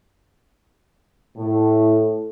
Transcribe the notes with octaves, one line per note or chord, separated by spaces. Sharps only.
A2